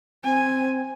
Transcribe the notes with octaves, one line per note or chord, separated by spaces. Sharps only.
C4 G#5